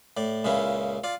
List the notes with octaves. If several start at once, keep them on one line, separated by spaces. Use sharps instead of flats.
A2 D5
C#2 A#2 C#3 C#4 E4
F4 D5